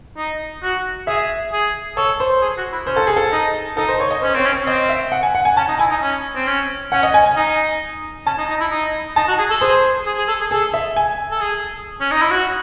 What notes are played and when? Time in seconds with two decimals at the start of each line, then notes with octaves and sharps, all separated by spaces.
0.17 D#4
0.63 F#4
1.07 G#4 E5
1.52 G#4
1.97 A4 C#5
2.20 C5
2.42 G#4
2.58 F#4
2.72 E4
2.87 C#4 C5
2.96 A4
3.07 G#4
3.17 A4
3.32 D#4
3.77 D#4 A4
3.89 C5
4.00 C#5
4.11 D#5
4.22 C#4 C5
4.34 C4 C#5
4.45 C#4
4.52 C#5
4.67 C4 D#5
4.89 E5
5.12 F#5
5.23 G#5
5.35 F#5
5.45 G#5
5.57 C#4 A5
5.68 D#4
5.79 E4 G#5
5.91 D#4
6.02 C#4
6.36 C4
6.47 C#4
6.92 C#4 F#5
7.03 D#5
7.14 G#5
7.26 G#5
7.36 D#4
8.26 C#4 A5
8.38 D#4
8.49 D#4
8.60 E4
8.71 D#4
9.16 D#4 A5
9.28 F#4
9.38 G#4
9.50 A4
9.61 G#4 C5
10.06 G#4
10.18 G#4
10.28 A4
10.40 G#4
10.51 G#4 A4
10.74 E5
10.96 G#5
11.31 A4
11.41 G#4
12.00 C#4
12.12 D#4
12.22 E4
12.31 F#4